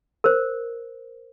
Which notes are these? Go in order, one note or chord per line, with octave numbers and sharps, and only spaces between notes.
A#4 C5